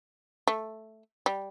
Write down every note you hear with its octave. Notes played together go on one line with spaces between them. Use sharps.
A3
G3